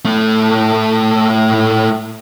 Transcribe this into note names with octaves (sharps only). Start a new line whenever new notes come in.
A2 A3